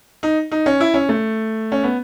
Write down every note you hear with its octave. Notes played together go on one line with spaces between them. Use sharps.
D#4
D#4
C#4
E4
C#4
A3
C#4
B3